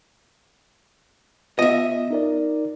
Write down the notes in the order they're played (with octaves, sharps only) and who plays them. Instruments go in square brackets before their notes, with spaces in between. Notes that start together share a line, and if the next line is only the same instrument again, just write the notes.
[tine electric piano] B3 F4 [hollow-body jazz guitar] D#5 E5
[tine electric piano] D#4 A#4 D5